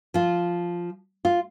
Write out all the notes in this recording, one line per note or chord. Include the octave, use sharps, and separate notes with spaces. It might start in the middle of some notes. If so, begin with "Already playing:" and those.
F3 F4
F4